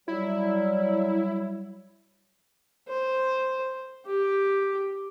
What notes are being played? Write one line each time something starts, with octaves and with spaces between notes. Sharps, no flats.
F#3 G3 E4
C5
G4